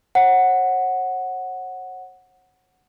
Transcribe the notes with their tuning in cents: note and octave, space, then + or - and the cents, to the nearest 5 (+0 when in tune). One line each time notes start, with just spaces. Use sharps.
C#5 -45 F#5 +0